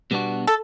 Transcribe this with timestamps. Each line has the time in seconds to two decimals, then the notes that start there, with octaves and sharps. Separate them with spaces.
0.11 B2 G3 B3 D4 F#4
0.47 A4